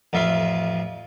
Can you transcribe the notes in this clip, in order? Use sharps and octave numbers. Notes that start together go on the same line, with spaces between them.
A1 F2 F4 E5 F5 C6